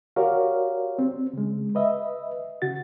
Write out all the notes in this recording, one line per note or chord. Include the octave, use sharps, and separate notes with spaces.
F#4 G4 A#4 C#5 D5 F5
C4
C#3 G#3
B4 D#5 E5
C#3 F#4 A6